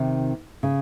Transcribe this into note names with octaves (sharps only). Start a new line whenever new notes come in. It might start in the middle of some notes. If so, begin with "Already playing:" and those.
Already playing: C3 D#3
C#3